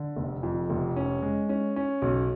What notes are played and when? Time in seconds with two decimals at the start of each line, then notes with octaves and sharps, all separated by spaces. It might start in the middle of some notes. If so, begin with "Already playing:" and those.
Already playing: D3
0.16 F1
0.43 F2
0.70 F1
0.96 C#4
1.22 G#3
1.49 C#4
1.76 C#4
2.02 B1